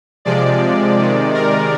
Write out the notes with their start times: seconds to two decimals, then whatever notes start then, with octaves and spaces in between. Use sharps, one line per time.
0.25 C3 F3 G#3 D5
0.98 C3 D#3 G#3
1.34 A#4